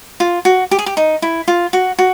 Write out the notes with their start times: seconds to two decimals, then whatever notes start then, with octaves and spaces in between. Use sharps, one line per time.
0.20 F4
0.45 F#4
0.71 G4
0.79 G#4
0.86 G4
0.97 D#4
1.22 E4
1.48 F4
1.73 F#4
1.99 F#4